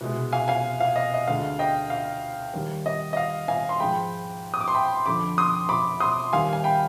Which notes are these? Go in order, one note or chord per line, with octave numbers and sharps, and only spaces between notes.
C2 B2 G#3
F5 G#5
F5 G#5
F5
D#5
D#5
D2 D3 G#3 F5
D#5 G5
F5
D#2 D#3 G3
D#5
D#5
F5
F5 G#5
C6
G#2 F3 G#3 G5 B5
D#6
D6
C6
G5 B5
F2 D3 F3 B5 D6
C6 D#6
B5 D6
C6 D#6
D#2 D#3 G3 F5 G#5
G#5
G5 B5